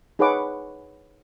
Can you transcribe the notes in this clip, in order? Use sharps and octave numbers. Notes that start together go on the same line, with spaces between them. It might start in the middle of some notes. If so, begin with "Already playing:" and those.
D#4 G#4 B4 C#5 F#5 D6